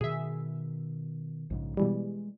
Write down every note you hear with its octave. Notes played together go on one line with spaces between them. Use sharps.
B2 D#3 G#4 E5
A#1 G#2 C#3
B2 E3 G3 G#3